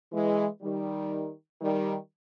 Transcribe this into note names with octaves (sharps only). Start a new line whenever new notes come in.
E3 G#3
D#3 G3
D#3 G3